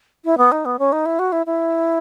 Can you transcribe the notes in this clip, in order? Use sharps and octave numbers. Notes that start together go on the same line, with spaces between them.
E4
B3
D#4
B3
C#4
D#4
E4
F#4
E4
E4